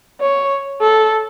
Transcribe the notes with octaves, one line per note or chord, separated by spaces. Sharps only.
C#5
A4